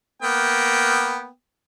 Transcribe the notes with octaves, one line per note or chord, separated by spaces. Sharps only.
A#3 B3 G5